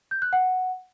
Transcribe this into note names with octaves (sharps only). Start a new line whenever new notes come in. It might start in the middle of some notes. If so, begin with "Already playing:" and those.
G6
F#6
F#5